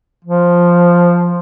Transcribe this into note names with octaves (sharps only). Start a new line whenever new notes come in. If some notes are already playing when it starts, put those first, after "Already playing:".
F3